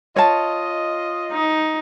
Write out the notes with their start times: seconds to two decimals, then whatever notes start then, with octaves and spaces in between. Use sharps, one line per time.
0.16 F4 C#5 D#5 A5
1.32 D#4